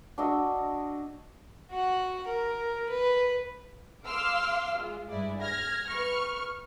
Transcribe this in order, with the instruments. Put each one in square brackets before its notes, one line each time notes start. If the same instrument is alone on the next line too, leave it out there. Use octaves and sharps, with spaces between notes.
[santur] D4 F#4 D#5 E6
[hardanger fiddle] F#4 F#5
A#4
B4
[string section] F5 C6 D6 E6 F6
G#3 F4
G2 G#3 E4 D5
F6 G#6 A#6
B4 C#6 F6